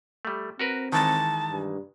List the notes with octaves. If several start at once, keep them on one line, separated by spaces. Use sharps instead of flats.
G3 A3
C4 F#4 A#4 B4
D#3 E3 G#3 A5
G2